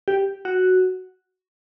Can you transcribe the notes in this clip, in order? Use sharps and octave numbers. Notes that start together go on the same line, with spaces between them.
G4
F#4